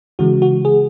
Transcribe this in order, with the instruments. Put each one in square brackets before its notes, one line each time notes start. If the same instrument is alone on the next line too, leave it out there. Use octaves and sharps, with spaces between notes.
[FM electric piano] C#3 E3 G#3 F#4
F#4
G#4